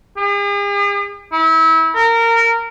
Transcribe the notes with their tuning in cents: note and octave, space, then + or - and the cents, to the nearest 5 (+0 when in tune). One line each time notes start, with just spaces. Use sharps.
G#4 -45
E4 -30
A#4 -20